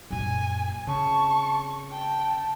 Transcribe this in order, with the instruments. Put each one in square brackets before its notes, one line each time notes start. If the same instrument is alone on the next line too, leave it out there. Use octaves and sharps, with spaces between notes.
[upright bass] F#2 A#2 [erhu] G#5
[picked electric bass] C#3 [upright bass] C4 [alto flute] A5 [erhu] C#6
[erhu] G5 [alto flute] A5